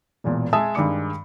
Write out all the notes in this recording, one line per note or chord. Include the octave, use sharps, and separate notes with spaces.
E1 E2 A#2
G#3 E5 G#5 A5 D#6
G2 D#3 G#3 D5 D6 C#7